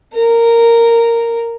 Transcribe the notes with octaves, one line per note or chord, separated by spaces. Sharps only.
A#4